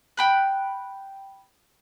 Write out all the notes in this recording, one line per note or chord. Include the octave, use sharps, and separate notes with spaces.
G5 B5 F#6